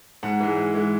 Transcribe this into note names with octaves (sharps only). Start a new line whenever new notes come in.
G#2 F#5
E3 G#3
G#2
E3 G#3